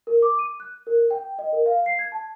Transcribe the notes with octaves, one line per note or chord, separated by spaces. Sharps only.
A#4
D6
D#7
F#6
A#4
G5
D#5
A#4
F5
C7
G#6
A5